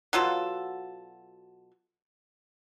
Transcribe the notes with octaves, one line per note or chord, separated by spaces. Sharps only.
B2 F#3 F4 A4